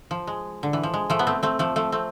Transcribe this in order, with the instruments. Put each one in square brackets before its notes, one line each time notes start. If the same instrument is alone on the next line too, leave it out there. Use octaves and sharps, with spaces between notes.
[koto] F3
G#3
D3
E3
F3
G#3
F3 A3
B3
A3 C4
A3 C4
F3 A3
F3 A3
A3 C4